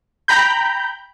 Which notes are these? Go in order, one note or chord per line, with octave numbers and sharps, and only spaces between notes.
G5 A#5 B5 G6